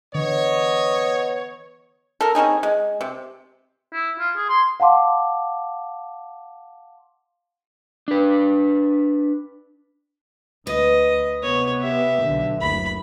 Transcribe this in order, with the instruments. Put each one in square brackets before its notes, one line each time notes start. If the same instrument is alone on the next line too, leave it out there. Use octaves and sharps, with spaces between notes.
[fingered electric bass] D3 E3 [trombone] B3 [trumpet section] C#5 [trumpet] D#5
[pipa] A4 A#4
C4 C#4 D#4 G#4
G#3
C3
[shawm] E4
F4
G#4
C6
[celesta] F5 F#5 A5 C6 D6
[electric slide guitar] D4 B4
[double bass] D2 [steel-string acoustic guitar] B4 [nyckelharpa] D#5
[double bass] C3 B3 [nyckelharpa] C#5
[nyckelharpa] G4 E5
[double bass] B1 D3
[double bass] F#1 D2 [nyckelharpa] B5